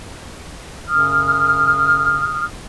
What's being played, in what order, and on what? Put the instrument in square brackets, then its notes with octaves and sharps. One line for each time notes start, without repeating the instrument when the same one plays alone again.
[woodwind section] F#2 C#3 D#6 F6